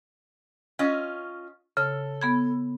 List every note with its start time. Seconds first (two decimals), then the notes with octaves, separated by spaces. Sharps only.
0.79 C#4 F4 D#5
1.77 C#3 A4
2.21 B3 B5 G#6